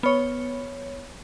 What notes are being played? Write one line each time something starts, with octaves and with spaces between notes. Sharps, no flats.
B3 C#5